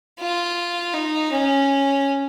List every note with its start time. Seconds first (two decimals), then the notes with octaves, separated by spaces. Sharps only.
0.20 F4
0.93 D#4
1.31 C#4